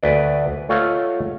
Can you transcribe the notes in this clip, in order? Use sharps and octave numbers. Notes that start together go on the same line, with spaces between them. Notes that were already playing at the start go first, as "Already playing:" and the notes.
D2 B4 D5
A3 F4 C#5 D#5 F5 F#5